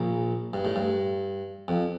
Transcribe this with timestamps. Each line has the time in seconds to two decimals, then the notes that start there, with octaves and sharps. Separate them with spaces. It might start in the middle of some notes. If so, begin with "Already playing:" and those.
Already playing: A#1 A#2
0.54 G2
0.65 A2
0.76 G2
1.68 F2